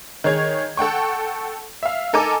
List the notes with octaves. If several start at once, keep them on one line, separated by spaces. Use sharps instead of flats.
D#3 G#4 C#5 G#6
A4 F#5 G5 C#6
E5 F5
D#4 A4 A#4 G#5 D6